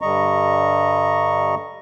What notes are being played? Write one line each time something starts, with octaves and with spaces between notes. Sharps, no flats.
G2 D3 G3 D#5 A#5 C#6